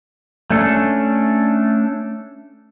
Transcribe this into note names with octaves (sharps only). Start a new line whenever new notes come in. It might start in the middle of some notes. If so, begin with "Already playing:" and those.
A3 C#4 D4 A4